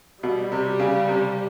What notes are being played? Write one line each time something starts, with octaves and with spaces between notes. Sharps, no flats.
B2 G3
C3
C#3
C3